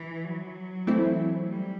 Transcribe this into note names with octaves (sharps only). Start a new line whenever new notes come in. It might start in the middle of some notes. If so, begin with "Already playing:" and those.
Already playing: E3
F#3
E3 A3 C4 E4
G3